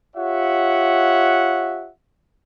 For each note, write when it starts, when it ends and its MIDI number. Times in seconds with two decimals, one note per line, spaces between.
0.16 1.89 65
0.16 1.89 67
0.16 1.89 73
0.16 1.89 76
0.16 1.89 78